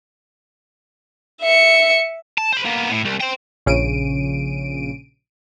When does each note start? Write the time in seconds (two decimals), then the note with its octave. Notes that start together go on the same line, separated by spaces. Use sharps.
1.41 E5 C#7
2.38 A5
2.52 C5 B5
2.65 A#3 B3
2.91 A2
3.05 C2
3.21 C5 G5
3.66 A#1 C#3 D7 D#7